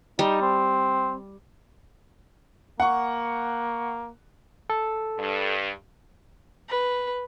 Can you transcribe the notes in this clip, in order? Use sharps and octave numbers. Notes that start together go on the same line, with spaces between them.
G3 D#4
C4
A#3 F#5 C#6
A4
G2
B4